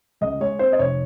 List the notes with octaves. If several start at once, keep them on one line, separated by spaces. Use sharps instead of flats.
C#2 D#5
G#3 C#5
C4 C5
D#5
F1 C#5